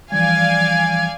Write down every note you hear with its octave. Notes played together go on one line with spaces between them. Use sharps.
E3 F3 G3 D5 F5 G#5 G#6